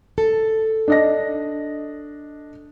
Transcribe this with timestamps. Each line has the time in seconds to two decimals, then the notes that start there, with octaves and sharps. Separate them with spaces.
0.18 A4
0.88 D4 D#5 A#6